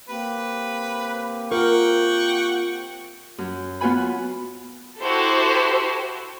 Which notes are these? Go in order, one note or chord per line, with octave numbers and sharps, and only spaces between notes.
A#3 C4 G4 B4
F4 A#4 F#5 G5 C#6
F#2
B3 F4 F#4 B4 G#5 B5
E4 F#4 G4 A4 C5